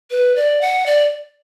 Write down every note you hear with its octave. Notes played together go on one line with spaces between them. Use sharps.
B4
D5
F#5
D5